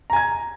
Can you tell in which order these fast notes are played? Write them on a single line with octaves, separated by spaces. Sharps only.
A#5 G#5 G#6